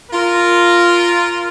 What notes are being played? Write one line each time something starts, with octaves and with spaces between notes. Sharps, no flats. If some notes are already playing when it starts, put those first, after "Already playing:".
F4 A#4